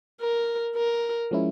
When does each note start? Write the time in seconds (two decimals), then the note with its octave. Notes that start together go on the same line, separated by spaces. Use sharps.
0.21 A#4
0.76 A#4
1.31 F3 G#3 C#4 E4